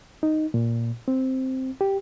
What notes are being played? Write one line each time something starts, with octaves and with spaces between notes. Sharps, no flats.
D#4
A#2
C4
G4